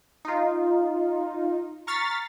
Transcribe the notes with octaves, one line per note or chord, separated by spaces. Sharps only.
D#4 F4
A#5 C#6 F6 A6 B6 C7